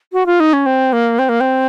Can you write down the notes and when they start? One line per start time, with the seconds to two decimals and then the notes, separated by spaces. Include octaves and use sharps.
0.13 F#4
0.26 F4
0.40 D#4
0.53 C#4
0.66 C4
0.93 A#3
1.19 C4
1.29 A#3
1.40 C4